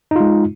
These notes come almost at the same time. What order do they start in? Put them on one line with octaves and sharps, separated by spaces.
D#4 F4 G#3